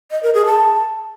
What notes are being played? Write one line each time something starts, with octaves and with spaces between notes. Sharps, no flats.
D#5
A#4
G#4
A5